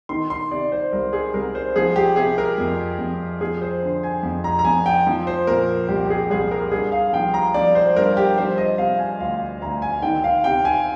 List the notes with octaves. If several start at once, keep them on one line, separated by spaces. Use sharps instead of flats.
D#3 C6
C6
C3 D5
C5
C2 A#4
G#4
C2 A#4
C5
F3 G#4
G4
C3 G#4
A#4
F2
F2
F3 G#4
C5
D3
G#5
F2
A#5
A#5
F2 G#5
G5
F3
C5
A#2 A#4
C2 G4
G4
G#4
C2 G#4
A#4
G2 G#4
F5
F3 G5
A#5
F3 D5
C5
G2 A#4
G4
F3 C5
D#5
C3 F5
G#5
D2 F5
D2 A#5
G#5
D#3 G5
F5
C3 G5
G#5